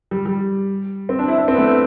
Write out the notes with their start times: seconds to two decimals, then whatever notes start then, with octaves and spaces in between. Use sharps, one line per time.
0.11 G3
0.26 G3
1.09 C4
1.19 D4
1.28 E4
1.38 D4
1.48 C4
1.54 B3
1.58 A3